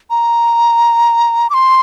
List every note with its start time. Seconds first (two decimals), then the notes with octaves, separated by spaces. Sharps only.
0.10 A#5
1.50 D6
1.54 C6